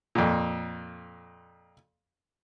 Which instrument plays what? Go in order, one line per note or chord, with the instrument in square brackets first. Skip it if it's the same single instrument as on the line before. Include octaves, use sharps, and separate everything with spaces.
[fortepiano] F2 A#2